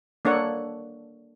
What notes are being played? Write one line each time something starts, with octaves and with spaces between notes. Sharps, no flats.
A#3 D4 A4 C#5 F#5